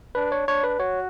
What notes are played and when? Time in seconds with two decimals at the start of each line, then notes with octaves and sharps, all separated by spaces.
0.15 D4 B4
0.32 C#5
0.48 D4 C#5
0.64 B4
0.79 F#4 C#5